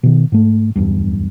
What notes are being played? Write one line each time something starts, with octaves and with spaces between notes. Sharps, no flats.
B2 D#3
G#2 A3
D1 E2 G2